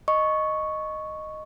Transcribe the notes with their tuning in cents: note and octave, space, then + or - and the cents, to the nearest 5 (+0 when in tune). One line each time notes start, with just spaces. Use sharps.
D#5 -5 C#6 +0